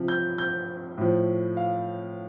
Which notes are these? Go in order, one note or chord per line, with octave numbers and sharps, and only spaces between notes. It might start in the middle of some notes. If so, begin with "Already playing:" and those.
Already playing: C3 F3
G6
G6
A2 F3
F5